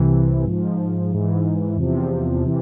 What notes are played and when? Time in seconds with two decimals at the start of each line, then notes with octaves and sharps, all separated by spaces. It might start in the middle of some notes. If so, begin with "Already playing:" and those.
Already playing: C2 C3 E3
0.44 G#2 F3
1.10 G#2 E3
1.76 E2 C3 F3
2.44 C3 E3